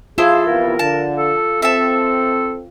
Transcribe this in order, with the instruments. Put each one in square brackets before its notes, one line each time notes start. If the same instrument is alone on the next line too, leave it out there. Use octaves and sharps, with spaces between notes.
[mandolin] E4 A4 C5 [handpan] F4 [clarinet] G#4
[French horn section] C3 E3 B3 [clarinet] A#4
[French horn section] D3 [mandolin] A5
[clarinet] A4
[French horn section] C4 [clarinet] A4 [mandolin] E5 A5